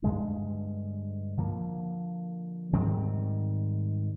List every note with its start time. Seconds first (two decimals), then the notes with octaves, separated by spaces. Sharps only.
0.02 G2 D3 G#3 D4
1.37 D3 F3 A#3
2.73 G#2 D#3 G3 C4